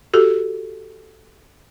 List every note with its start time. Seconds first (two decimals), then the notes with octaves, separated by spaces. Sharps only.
0.14 F#4 G4 A4